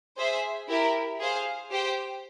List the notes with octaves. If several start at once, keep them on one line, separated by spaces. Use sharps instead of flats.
G#4 C5 E5
E4 G4 A#4 E5
G#4 C5 F5
G4 C5 G5